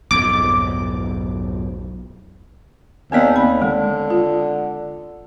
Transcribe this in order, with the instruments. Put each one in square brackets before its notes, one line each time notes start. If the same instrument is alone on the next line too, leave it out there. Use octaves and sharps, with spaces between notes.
[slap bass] B1 F2 G#2 [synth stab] D6
[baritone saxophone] D#2 [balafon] B3 C4 D5
[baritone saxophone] D#2 [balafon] B5
[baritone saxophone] D3 [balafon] G#3
[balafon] F4